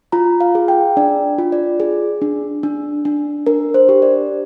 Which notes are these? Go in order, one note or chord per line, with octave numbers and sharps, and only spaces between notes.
F4 A#5
F5
G#4
G5
D4 D5
F4
D5
G#4
D4
D4
D4
D4 A#4
C5
G4
D5